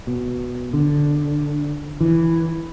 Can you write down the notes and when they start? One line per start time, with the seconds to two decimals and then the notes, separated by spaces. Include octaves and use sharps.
0.07 B2
0.73 D3
2.01 E3